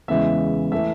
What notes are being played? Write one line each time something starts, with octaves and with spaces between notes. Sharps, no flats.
E2 C#3 E3 G#3 E5
E3 A3 E5